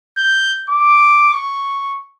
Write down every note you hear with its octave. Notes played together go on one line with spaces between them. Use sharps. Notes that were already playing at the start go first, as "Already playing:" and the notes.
G6
D6
C#6